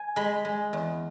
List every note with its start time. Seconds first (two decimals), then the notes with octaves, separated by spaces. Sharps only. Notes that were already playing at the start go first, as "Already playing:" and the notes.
Already playing: G#5
0.16 G#3 B5
0.45 G#3
0.73 E2